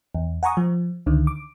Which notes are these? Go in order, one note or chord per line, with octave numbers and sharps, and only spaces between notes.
E2
F#5 G#5 A#5 C#6 D#6
F3
C#2 D3 D#3
D6